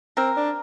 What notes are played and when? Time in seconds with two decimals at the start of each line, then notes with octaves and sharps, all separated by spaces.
0.17 C4 A#4
0.36 D4